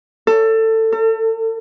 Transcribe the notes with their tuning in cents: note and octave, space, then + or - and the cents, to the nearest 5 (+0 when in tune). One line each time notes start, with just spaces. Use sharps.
A4 +20
A4 +40